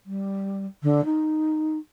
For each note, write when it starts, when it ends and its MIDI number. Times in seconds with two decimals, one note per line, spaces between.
0.06 0.65 55
0.82 1.03 50
1.04 1.77 63